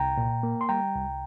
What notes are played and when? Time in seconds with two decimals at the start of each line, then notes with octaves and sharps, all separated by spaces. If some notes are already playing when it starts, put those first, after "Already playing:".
Already playing: C2 G5 A#5
0.17 A#2
0.43 A#3
0.61 C6
0.69 G3 G5 A#5
0.95 C2